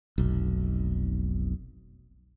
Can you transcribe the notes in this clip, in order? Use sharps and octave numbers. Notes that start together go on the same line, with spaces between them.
F1 B1